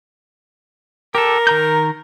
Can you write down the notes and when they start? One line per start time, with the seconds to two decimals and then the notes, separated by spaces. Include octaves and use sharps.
1.15 G4 A4 A#4
1.47 D#3 A#5 G6